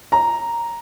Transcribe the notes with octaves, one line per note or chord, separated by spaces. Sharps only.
A#5